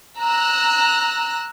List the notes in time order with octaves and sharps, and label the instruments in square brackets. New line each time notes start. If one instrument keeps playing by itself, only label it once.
[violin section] A#5 E6 F#6